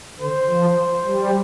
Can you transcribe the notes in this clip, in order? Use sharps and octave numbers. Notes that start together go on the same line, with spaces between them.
D3 C5
F3
G3